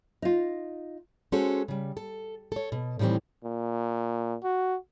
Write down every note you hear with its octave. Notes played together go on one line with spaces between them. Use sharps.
D#4 F4
G#3 C#4 F#4 A4 C5 C#5
C#3 G3
A4
A4 C#5
B2
A2 D#3 E3 G3 C4
A#2
F#4